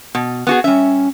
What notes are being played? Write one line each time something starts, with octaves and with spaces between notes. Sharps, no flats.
B2
B3 F#4 G#4
G3 C#4 E5